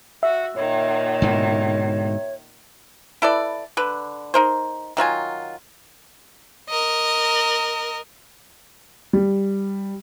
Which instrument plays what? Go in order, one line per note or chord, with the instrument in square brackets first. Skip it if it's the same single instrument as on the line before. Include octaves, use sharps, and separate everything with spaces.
[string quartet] F#4 [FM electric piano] E5
[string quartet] A#2 D#3 [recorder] C#5
[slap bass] G#2 B2 D3
[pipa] E4 A4 B4 D5
D3 B4
D#4 A#4 C5
D#3 F#3 F4 G#5
[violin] A#4 D#5
[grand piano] G3